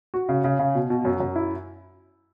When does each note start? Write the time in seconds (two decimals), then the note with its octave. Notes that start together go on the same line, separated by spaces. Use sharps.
0.14 F#4
0.29 C#3
0.44 C#3
0.59 C#3
0.75 B2
0.90 B2
1.05 F#2
1.20 F#2
1.36 E4